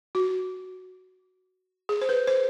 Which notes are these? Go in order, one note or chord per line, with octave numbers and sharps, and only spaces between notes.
F#4
G#4
C5
B4
C5